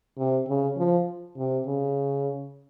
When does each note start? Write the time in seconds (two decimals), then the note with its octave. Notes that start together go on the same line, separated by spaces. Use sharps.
0.17 C3
0.48 C#3
0.77 F3
1.37 C3
1.66 C#3